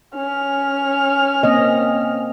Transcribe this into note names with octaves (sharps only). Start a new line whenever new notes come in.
C#4 F6
A#3 C4 D#5